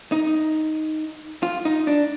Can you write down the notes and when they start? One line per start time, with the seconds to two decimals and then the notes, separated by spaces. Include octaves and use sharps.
0.12 D#4
1.43 F4
1.65 D#4
1.87 D4